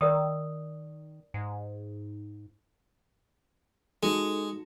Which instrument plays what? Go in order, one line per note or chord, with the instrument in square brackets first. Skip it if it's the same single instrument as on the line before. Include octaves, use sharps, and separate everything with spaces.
[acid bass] D#3 [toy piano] A#4 D5 D#6
[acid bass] G#2
[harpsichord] G#3 [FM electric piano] D#4 F#4 A4